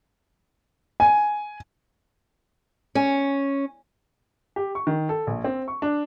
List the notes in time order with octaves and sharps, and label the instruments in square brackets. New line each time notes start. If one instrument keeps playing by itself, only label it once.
[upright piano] G#5
[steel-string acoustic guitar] C#4
[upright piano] G4
C#6
D#3
A4
A#1
C4
C#6
D4